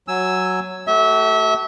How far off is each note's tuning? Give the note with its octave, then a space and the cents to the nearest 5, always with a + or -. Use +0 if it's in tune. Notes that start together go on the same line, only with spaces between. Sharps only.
F#3 +0 G#5 +0 E6 +0
A3 +0 F#4 +40 E5 -25